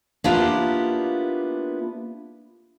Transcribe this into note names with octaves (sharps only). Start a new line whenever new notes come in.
A#3 B3 D4 E4 F4 G4